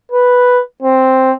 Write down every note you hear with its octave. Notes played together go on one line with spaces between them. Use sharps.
B4
C4